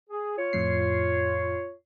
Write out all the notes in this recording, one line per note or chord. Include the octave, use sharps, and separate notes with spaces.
G#4
F4 C#5
F2 A2 C7